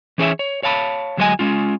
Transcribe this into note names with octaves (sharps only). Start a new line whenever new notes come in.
E3 C#4 G#4 C5 C#5 E5
C#5
C#5 F5 A5 B5
D2 F#3 G#3 C#5 D#5 G#5
G#3 C#4 F4